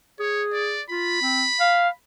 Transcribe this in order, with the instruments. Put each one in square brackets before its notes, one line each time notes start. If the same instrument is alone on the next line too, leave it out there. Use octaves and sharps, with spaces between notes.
[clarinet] G#4 [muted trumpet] C#5
[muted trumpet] D5
[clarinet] F4 [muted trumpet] B5
[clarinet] C4
F5